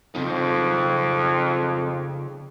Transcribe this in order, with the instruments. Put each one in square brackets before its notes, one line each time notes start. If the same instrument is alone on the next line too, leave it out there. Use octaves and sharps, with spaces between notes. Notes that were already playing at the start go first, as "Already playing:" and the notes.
[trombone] F2 [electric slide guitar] C#3 C4 D#4